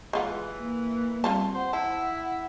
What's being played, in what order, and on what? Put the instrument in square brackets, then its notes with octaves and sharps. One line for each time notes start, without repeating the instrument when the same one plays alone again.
[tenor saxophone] E3 [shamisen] G#3 F4 F#5
[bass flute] A#3
[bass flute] G3 [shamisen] C4 F4 A5
[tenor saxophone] C5 [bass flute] F#5
[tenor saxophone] E4 [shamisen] A5